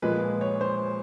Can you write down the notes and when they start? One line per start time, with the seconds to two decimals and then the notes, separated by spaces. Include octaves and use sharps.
0.02 A#2 F3 G#3 B4
0.41 C#5
0.61 C5